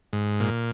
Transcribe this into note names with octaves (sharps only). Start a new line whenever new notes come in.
G#2
A#2